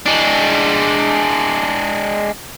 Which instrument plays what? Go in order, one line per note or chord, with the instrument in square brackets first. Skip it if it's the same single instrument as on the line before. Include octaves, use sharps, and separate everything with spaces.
[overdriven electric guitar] G#3 D4